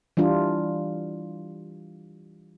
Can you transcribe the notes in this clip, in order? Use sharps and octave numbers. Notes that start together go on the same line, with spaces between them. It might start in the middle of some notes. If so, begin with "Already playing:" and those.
E3 G3 D4 F4